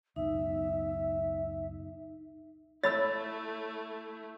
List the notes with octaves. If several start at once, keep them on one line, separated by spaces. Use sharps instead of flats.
C#2 F#2 B2 D#4 E5
A3 E4 C#5 B5 E6 A6